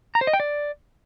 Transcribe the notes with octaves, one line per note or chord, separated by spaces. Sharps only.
A#5
C5
D#5
G5
D5